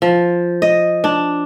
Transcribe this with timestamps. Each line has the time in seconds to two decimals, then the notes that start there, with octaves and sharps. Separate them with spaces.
0.02 F3
0.62 D#5
1.04 D4